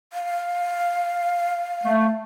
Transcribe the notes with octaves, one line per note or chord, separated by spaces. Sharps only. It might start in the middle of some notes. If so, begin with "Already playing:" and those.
F5
A3